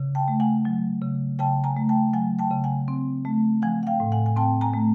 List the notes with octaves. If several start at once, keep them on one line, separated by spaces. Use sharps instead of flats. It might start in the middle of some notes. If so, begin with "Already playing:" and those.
Already playing: C#3
G5 A5
A3
F#5 G#5
F#3
C#3
C#3 G5 A5
G#5 A#5
A3
G5 A5
F#3 F#5 G#5
G5 A5
C#3
F#5 G#5
C4
A3
F3 F#5 G#5
F#5
F5 G5
A2
F#5 G#5
G#5
C4 G5 A5
G#5 A#5
A3